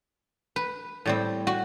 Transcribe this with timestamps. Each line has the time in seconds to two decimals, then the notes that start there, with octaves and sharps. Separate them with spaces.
0.56 B4
1.06 A2 G3 C4
1.47 F#4